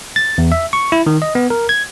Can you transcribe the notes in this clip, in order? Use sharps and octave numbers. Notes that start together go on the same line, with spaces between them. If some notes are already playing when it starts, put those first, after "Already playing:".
A6
E2
E5
C#6
E4
D#3
D#5
B3
A#4
G#6